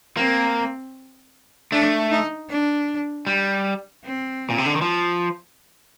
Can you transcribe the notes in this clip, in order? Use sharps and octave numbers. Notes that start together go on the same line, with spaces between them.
A#3 C4
A3 D4
D#4
D4
G3
C4
A#2
C3
D3
D#3
F3